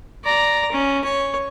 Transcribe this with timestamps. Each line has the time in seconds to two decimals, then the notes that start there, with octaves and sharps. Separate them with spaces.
0.24 D5 A#5
0.71 C#4
1.04 C#5